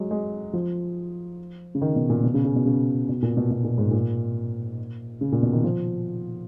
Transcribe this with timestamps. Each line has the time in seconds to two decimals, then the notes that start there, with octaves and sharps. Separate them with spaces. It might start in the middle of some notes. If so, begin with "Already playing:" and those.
Already playing: F#3 G#3
0.11 G#3
0.53 F3
1.75 C#3
1.81 D#3
1.96 B2
2.10 A#2
2.23 B2
2.34 C#3
2.45 C#3
2.56 B2
2.66 C#3
3.09 B2
3.22 A#2
3.37 B2
3.51 B2
3.64 A#2
3.78 G#2
3.91 A#2
5.21 C#3
5.32 A#2
5.43 B2
5.53 D#3
5.64 F3